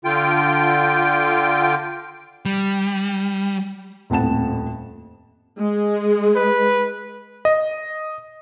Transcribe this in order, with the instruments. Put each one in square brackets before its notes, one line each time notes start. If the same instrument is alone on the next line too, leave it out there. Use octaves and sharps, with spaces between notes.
[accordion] D3 F4 G5
[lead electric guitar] G3
[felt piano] D#1 F2 A2 F#5 A5 E7
[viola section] G#3
[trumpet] B4
[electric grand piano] D#5